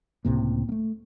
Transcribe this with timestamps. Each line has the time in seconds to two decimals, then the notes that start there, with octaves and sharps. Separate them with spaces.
0.25 C#2 A2 C3 A#3
0.69 A3 A#3